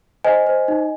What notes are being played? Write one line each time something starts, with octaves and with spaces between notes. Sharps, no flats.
C5 D#5 G#5
C5
D#4